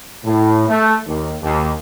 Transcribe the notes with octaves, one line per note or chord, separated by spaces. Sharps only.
A2
A3
D#2
D#2